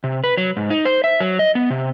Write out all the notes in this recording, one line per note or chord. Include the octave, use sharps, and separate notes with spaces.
C3
B4
F#3
G#2
D#4
C5
E5
F#3
D#5
B3
C3